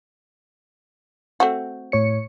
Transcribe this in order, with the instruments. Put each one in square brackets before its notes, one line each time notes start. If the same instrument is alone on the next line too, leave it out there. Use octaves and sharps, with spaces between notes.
[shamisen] A3 C4 F#4
[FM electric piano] A2 C#5 C#7